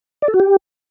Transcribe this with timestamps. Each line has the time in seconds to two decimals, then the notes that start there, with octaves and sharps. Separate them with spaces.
0.22 D5
0.28 A4
0.34 F#4
0.40 G4